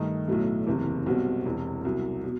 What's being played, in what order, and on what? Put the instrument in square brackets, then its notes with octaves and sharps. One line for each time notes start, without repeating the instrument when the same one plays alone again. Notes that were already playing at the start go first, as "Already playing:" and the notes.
Already playing: [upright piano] G2 D#3 A3 D#4
B1 A2 F#3 A3
F#1 E2 C3
B1 B2 G3 C4 F#4
E1 E2 C3
C2 B2 F#3
B2